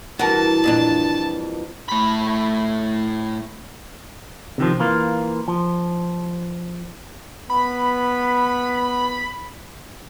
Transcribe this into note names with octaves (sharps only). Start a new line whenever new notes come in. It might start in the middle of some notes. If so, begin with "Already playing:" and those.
G2 E3 F#4 A#4 A5
F2 A#2 D4
A2 B5
C3 D#3 F3
E3 A#3 F4
F3
B3 B5